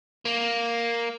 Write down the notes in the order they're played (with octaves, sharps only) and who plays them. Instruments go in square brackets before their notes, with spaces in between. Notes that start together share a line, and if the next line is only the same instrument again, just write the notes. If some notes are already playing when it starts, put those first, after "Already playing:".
[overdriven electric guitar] A#3